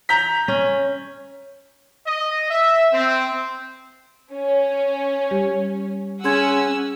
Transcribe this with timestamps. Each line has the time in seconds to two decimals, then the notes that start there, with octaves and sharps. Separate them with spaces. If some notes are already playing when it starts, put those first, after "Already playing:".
0.09 A#5 G6 B6
0.48 C#4
2.06 D#5
2.50 E5
2.93 C4
4.34 C#4
5.31 G3 G4
6.24 C#4 G#4 F#5 G#5 C6 E6 G#6